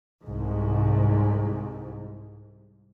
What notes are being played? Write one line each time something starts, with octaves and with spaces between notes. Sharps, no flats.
C2 G#2